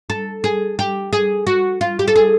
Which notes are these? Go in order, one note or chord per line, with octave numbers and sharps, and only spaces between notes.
A4
G#4
G4
G#4
F#4
F4
G4
A4
G#4